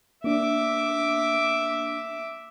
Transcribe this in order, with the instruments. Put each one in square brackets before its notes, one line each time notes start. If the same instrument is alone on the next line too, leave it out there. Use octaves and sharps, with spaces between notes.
[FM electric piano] A#3 D4 [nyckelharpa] E5 D6